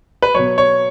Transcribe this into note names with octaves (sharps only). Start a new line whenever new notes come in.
B4
B2 F#3 C#5
C#5